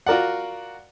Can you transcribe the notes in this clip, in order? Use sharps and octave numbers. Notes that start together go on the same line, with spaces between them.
F4 F#4 A#4 D5 F#5